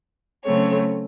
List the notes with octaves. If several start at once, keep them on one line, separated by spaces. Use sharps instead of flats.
C#3 F#3 A3 C4 C#5